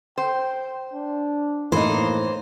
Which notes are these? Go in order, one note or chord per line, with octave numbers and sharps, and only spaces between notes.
C5 G5
D4
A2 E3 A#3 D#4 C5